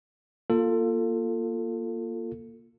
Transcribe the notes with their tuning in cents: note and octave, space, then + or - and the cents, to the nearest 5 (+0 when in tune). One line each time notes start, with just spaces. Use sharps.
A#3 +10 F4 +0 A4 +20